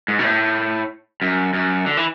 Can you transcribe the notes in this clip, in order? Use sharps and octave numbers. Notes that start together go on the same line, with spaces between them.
G#2
B2
A2
F#2
F#2
D3
E3